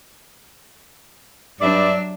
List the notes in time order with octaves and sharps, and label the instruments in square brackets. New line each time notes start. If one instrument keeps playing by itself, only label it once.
[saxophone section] G2 D5 E5 [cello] F#3 D4